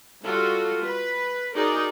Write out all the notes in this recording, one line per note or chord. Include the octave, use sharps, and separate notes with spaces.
G3 F4 F#4 A4
B4
D#4 F#4 G#4 A#4 D5